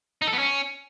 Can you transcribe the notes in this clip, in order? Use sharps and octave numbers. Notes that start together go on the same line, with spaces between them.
D#4
A4
B3
C#4